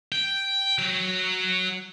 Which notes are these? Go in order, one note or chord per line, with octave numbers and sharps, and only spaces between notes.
G5
F#3